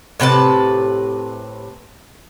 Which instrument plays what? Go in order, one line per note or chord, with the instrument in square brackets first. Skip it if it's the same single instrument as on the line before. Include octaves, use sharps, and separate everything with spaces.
[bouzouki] A2 C3 B4 A5